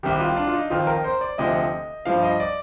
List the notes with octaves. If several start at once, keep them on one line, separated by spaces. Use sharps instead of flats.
C2 C3 D#3 G4
F4
D4
F4
D#4
F2 D#3 F4
A#4
C5
D5
D2 C3 F3 D#5
G2 F3 F5
D#5
D5